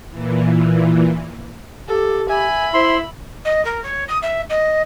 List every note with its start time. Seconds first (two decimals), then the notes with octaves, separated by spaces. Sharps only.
0.11 A#2 E3
1.88 G4 A4
2.30 E5 G#5 B5
2.74 E4 C5 C6
3.44 D#5
3.64 A#4
3.83 C#5
4.08 D#6
4.22 E5
4.49 D#5